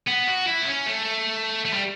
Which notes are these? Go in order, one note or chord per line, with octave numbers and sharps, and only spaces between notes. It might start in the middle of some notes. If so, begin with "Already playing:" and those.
B3
F#4
E4
B3
C#4
A3
A3
G3